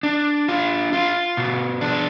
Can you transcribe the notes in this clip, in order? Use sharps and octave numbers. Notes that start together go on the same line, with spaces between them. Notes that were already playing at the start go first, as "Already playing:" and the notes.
D4
F4
F4
B2
D4